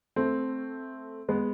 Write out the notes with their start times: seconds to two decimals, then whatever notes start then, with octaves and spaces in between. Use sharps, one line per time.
0.16 A3 C4
1.29 G#3 B3